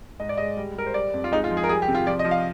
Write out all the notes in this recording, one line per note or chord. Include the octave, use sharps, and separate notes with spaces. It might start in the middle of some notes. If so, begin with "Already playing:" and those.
G#2 D#5
D5
G#3 D#5
G3
G3 A#4
C5
G3 D5
F2
F4
G#3 D#4
F4
F3
G#4
A#4
G3 G#4
G4
C3
F4
F3 D5
D#5
F3
F5